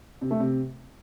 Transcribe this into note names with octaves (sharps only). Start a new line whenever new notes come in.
C3
A3
C3